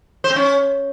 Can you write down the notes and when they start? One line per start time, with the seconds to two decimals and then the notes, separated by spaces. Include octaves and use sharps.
0.24 C5
0.30 C4
0.36 C#4